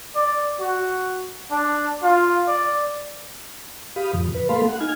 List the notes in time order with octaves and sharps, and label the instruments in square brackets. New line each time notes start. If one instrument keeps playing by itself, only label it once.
[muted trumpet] D5
F#4
D4
F4
D5
[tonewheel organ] G4 F5 B5 D#6
F2 A2 C#3 F3
B4
A3 A#3 A4 F5 B5 C6
F#5
D#4 G#5 F6 G#6